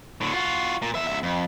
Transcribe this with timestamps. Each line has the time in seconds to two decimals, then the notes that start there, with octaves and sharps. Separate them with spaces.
0.21 A2 D3
0.33 F4 F#4
0.82 A#2
0.95 E2 E5
1.07 C#2 E5
1.23 F2